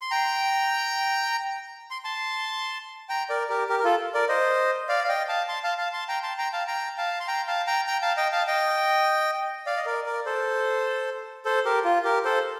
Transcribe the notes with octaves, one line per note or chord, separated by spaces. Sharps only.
C6
G5 A#5
C6
A5 C6
G5 A#5
A#4 D5
G4 A#4
G4 A#4
A#4
F4 A4
A#4 D5
C5 D#5
D5 F5
F5
D#5 G5
F5 A5
A5 C6
F5 A5
F5 A5
A5 C6
G5 A#5
A5 C6
G5 A#5
F5 A5
G5 A#5
F5 A5
C6
G5 A#5
F5 A5
G5 A#5
G5 A#5
F5 A5
D#5 G5
F5 A5
D#5 G5
D5 F5
D#5
A#4 D5
A#4 D5
A4 C5
A4 C5
G4 A#4
F4
G4 A#4
A4 C5